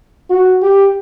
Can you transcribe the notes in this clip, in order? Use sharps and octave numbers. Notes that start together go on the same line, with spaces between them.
F#4
G4